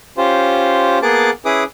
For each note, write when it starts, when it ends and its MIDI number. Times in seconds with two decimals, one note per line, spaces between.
0.18 0.99 61
0.18 0.99 65
0.18 0.99 67
0.18 0.99 72
1.02 1.30 58
1.02 1.30 59
1.02 1.30 68
1.02 1.30 81
1.02 1.30 86
1.45 1.63 61
1.45 1.63 64
1.45 1.63 68
1.45 1.63 71
1.45 1.63 86
1.45 1.63 87